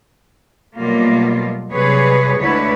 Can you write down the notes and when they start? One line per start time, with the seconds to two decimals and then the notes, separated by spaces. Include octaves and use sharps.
0.75 B2 F#3 G3 A3 A#3 F4
1.71 C3 F#3 G3 G#4 B4 C#5
2.39 D2 D3 G#3 E4 B4 C#5